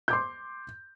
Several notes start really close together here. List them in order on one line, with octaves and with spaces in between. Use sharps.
G6 D6 C6